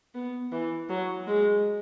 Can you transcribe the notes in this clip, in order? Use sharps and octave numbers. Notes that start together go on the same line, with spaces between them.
B3
E3
F#3
G#3